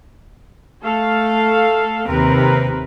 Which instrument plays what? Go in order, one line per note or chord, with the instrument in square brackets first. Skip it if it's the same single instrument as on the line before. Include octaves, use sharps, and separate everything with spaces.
[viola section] A3 A4 F5
[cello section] D#2 C3 [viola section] C4 A#4 B4